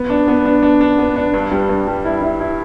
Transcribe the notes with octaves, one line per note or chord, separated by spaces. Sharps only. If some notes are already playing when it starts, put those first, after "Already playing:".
Already playing: B3
D4
B3
D4
D4
D4
B3
D4
G2
G3
G2
G3
E4
E4
E4